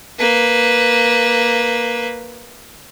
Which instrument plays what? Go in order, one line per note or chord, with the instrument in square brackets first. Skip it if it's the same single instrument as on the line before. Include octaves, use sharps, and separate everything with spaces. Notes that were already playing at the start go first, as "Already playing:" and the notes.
[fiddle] A#3 B4